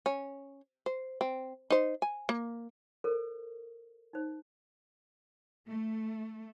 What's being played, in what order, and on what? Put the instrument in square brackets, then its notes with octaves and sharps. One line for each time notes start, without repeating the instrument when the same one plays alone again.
[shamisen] C#4
C5
C4
D#4 C5
G#5
A#3
[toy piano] A4 A#4 C5
D#4 C5
[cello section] A3